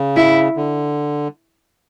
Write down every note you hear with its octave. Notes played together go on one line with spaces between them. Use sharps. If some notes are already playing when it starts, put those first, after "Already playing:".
Already playing: C#3
E4
D3